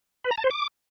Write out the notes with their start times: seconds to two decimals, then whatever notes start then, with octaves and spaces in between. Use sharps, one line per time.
0.24 B4
0.31 A#5
0.38 A5
0.44 C5
0.51 D6